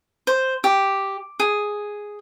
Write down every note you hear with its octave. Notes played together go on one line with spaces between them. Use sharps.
C5
G4
G#4